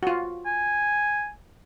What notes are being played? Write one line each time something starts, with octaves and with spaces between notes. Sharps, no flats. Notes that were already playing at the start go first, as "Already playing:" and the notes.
F4 F#4
G#5